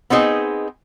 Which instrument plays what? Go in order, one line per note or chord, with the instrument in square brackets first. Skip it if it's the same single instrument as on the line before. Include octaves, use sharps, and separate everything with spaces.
[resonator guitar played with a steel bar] B3 C4 D#4 G#4 D#5